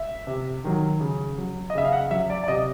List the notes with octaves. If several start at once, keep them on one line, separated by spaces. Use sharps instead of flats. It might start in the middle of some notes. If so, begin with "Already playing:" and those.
Already playing: E5
C3
D#3 F#3
C#3
F#3
D#5
C#3 E5
F5
F#5
F#3 E5
D5
D5
C3 D#5